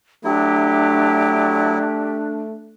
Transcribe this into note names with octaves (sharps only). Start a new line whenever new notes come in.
F#3 A3 D4 E4 G4